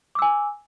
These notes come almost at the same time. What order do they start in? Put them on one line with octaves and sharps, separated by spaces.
D6 E6 G#5